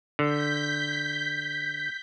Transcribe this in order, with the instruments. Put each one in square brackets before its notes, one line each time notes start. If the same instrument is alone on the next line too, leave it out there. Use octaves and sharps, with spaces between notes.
[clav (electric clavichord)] D3 [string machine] G6 B6